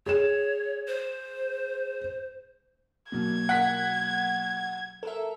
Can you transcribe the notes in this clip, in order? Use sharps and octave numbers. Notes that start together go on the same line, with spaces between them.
G#4 C#5 E7
C5
B2 F#3 A#3 G#6
F#5 B6
A4 A#4 E5